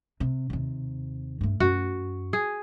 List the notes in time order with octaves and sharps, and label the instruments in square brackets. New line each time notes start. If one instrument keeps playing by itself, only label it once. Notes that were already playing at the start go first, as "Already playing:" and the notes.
[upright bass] C3
D#2 C3
G2 A3
[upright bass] F#2 [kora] F#4
[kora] G#4